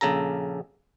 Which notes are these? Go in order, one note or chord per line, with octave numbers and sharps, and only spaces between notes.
A#1 C#3 A4 A#5